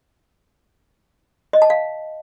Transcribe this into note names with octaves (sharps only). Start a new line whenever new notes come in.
D#5
A5
F5